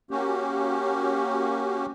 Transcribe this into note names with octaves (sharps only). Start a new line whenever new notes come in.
A#3 C#4 F#4 G4